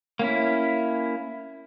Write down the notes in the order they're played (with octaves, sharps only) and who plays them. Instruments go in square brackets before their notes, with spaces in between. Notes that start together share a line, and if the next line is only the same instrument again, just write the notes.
[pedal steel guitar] A#3 C#4 E4